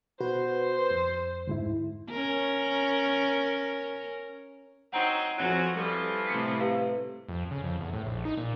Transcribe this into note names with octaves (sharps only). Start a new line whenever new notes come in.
B2 F#4 B4 C5
F2
D2 G#2 E4
C#4 A#4
F#3 C4 D#4 F#5 A#5
F2 C#3 E3 F#3 F#4
E3 F3 G3 A4
A2 C3 B6 C#7
G4 B4 F5
F2
C#3
F2
E2
A2
A#1
D#4
A#2